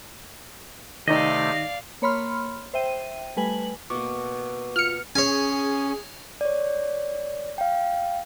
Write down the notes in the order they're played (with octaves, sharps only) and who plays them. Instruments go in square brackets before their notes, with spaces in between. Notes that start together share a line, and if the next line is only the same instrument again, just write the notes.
[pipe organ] C3 A3 G4 [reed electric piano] D#3 D#4 [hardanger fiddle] D5 F5 [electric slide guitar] D#5
[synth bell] A#3 C#5 B5 C6 F6
C5 E5 G5 D#7
G3 A3 B4 G#5 F#7
[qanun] B2 A#3 [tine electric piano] C#6 D6
[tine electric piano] F4 [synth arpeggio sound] F6 C#7
[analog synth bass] C#4 [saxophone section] G#4 [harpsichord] C#5 G#5
[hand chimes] C#5 D5
F5 G5